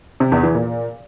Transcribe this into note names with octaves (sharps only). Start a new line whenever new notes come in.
C3
E2
E3
A#2